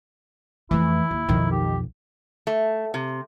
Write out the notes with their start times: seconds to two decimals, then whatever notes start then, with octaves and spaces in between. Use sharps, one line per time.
0.71 F2 E3 A3 E4
1.11 D#2
1.29 B1 F2 D#3
1.51 G4
2.47 A3
2.94 C3